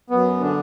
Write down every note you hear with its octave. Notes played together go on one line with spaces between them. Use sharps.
F#2 B3
D3 D4